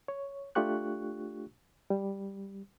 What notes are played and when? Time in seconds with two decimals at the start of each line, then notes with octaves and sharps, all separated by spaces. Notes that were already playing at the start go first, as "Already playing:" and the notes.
0.08 C#5
0.55 A3 D4 F4 G4 C#6 F#6
1.90 G3